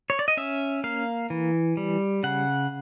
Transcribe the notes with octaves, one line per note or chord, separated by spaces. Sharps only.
C#5
D5
D#5
C#4 E5
A#3 F5
E3
G3
C#3 F#5